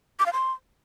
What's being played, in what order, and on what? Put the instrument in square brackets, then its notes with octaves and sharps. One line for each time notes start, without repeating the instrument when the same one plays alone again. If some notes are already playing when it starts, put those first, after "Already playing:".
[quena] D6
F5
C6